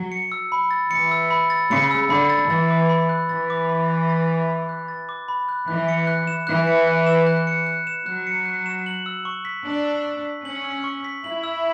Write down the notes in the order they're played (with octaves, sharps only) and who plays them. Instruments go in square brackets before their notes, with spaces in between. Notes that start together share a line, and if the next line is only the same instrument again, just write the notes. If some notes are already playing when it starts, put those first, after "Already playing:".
Already playing: [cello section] F#3
[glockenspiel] C#7
E6
B5
A6
[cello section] E3 [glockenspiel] C#7
[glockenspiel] E6
B5
A6
[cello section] C#3 [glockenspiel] C#7
[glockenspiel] E6
[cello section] D3 [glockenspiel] B5
[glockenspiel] A6
[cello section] E3 [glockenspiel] A6
[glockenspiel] D6
B5
F#6
[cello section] E3 [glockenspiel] A6
[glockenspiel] D6
B5
F#6
A6
D6
B5
F#6
A6
D6
B5
F#6
[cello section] E3 [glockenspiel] F#6
[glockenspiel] C#7
F#6
E7
[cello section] E3 [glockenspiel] F#6
[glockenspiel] C#7
F#6
E7
F#6
C#7
F#6
E7
[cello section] F#3 [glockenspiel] F#6
[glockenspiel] C#7
F#6
E7
F#7
E6
C#6
B6
[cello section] D4 [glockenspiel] F#7
[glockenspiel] E6
C#6
B6
[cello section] C#4 [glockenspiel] F#7
[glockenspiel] E6
C#6
B6
[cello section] E4 [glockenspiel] F#7
[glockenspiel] E6